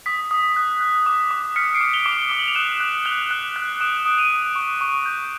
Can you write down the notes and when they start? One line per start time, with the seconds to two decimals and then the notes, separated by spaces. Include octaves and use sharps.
0.06 D#6 B6
0.31 D#6
0.56 F#6
0.81 F#6
1.06 D6
1.31 D6
1.56 F6 B6 C#7
1.75 C7 D7
1.80 D6
1.93 F7 G7
2.06 D6
2.12 F7 G7
2.30 D#6 G7
2.39 F#7
2.48 F7
2.55 F#6 E7 F#7
2.80 F#6
3.05 F#6 F7 G7
3.31 F#6
3.56 F#6
3.80 D#6 D7 E7
4.06 D#6
4.18 D#7 F7
4.31 D#6
4.55 C#6
4.81 C#6
5.06 G6